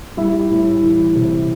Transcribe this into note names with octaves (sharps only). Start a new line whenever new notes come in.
G3 E4 E5
A2
E3
C3